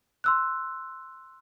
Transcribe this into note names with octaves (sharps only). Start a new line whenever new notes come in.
C6 E6 F#6